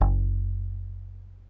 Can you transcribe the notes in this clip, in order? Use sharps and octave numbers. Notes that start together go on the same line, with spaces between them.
F#1